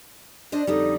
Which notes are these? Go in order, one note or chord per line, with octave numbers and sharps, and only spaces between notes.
D4 C5 D5 D#5
F2 D3 G3 D#4